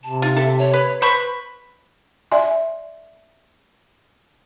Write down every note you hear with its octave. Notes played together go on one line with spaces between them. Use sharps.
C3 A5
D#4 F4
A4 E5
C#5
B4
B4 C5 B5 C#6
D5 E5 G#5 C6